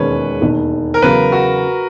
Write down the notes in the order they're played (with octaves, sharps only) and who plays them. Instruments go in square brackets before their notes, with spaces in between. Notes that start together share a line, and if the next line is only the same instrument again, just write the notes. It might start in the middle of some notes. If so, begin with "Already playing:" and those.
Already playing: [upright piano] E1 D#2 D#3 G#3 C#4 [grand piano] B4 C#5
[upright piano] E1 D#2 D#3
[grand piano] A#4
[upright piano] E2 C#3 F#3 [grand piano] B4
[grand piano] F#4